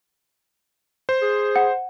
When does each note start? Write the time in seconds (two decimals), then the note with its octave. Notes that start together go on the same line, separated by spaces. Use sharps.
1.09 C5
1.22 G#4
1.56 F#5